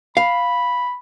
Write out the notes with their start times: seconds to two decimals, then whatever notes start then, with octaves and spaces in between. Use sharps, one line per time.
0.17 F5 B5